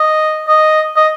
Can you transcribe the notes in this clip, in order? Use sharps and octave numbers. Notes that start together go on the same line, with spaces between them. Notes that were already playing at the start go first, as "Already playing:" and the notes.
Already playing: D#5
D#5
D#5